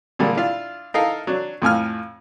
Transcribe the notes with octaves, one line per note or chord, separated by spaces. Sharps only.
A#2 D3 D#3 G3 G#3
D4 E4 F4
D#4 E4 A4 A#4 F5
F#3 D4
F2 A2 G#5 F6